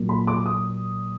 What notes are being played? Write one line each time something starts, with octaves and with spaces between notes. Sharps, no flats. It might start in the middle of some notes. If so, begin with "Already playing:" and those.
Already playing: A#2 F#3 A#3
B5
D6
D#6